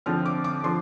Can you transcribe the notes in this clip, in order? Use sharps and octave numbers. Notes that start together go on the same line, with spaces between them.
D3 F3 C4 F6
D6
D6
D3 F3 C6